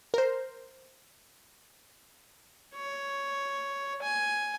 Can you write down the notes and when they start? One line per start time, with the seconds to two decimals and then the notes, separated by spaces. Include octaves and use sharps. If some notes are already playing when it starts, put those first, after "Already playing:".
0.14 A#4 C5
2.75 C#5
4.02 G#5